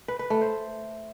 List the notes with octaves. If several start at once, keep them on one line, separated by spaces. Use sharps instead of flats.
B4
B4
A3
C5